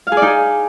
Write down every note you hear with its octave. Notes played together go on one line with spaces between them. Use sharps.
F5
G#4
D5
D#4
G#4